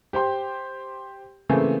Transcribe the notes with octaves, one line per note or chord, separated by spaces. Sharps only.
G4 C5 G5 C6
C#3 E3 A3 A#3 C4 G#5